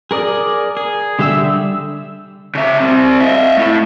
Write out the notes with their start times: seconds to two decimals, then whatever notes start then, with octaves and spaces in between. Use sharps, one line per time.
0.11 G#4 A#4 D5 D#6
0.77 G#4
1.19 D3 G3 G4 E5 E6
2.55 C#3 E5
2.80 G3 C4
3.20 D#5 E5
3.57 A3 E4